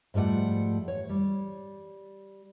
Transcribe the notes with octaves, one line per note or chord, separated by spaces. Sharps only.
G#2 F3 G3 A3 F#5
C#5
G3